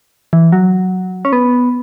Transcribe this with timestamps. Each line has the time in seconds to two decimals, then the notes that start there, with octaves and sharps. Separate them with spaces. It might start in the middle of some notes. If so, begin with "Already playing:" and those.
0.33 E3
0.52 F#3
1.25 C#4
1.33 B3